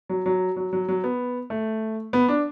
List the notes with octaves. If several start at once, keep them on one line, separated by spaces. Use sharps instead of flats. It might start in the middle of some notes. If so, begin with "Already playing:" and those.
F#3
F#3
F#3
F#3
F#3
B3
A3
B3
D4